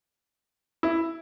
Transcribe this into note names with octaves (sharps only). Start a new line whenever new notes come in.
E4